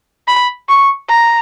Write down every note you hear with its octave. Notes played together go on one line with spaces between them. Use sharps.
B5
C#6
A#5